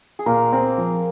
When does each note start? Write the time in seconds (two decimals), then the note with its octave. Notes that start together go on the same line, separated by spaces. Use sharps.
0.19 G#4
0.26 A#2 A#3 A#4
0.53 C4
0.78 F3